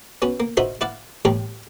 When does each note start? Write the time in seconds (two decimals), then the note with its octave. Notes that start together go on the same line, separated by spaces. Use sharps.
0.22 B3 C#4 F#4
0.40 A#3
0.57 D#4 F4 F#4 A#4 C5 E5
0.81 E4 D5 F5 F#5
1.25 A1 D#2 G3 A#4 C#5